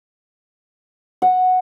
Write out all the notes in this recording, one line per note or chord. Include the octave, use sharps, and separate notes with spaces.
F#5